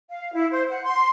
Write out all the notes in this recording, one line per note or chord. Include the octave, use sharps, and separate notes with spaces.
F5
E4
C5
F#5
C6